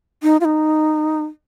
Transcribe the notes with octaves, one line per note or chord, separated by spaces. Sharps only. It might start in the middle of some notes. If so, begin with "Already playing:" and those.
D#4
F4
D#4